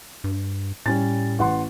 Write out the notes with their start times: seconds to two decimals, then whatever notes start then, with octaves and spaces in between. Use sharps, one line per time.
0.24 G2
0.86 A2 G3 C#4 A6
1.39 A1 F#5 C6